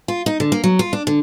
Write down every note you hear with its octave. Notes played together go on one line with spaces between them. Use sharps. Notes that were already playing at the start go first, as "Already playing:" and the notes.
F4
D#4
D3
A#3
F#3
F4
D4
D3